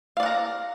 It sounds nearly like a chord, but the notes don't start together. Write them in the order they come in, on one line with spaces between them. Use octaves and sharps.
F5 D5 F#5 A#5